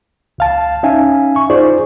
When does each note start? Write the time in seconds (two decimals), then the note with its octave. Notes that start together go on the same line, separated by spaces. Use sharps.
0.38 C#2 F5 A5
0.83 C#4 D#4 E5 F5 G#5
1.36 C#6
1.50 D#4 F4 G#4 C5 D5